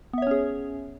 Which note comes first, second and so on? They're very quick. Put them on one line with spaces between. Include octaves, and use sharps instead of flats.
B3 E5 C#5 C#4 G#4